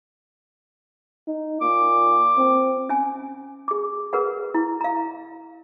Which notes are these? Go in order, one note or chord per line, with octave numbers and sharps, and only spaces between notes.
D#4
A#2 D6
C4
C#4 G#5
G#4 D6
G#4 A#4 B4 F#5
E4
F5 A#5